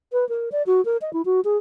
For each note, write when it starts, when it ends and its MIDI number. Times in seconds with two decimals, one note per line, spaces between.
0.12 0.27 71
0.29 0.49 70
0.52 0.63 74
0.66 0.84 66
0.85 0.97 70
1.02 1.13 75
1.13 1.22 64
1.25 1.40 66
1.45 1.57 68